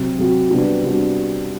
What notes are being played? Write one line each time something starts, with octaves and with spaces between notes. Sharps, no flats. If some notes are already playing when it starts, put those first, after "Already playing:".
Already playing: C3 F#3 C4 F#4
C3 F#3 C4 F#4
C3 G3 B3 D4 F#4
C3 G3 B3 D4 F#4